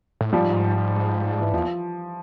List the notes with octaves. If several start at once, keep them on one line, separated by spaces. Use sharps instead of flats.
A2
G#2 F3 G3
E3
E2 F3